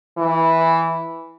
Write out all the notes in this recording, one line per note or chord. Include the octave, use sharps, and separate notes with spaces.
E3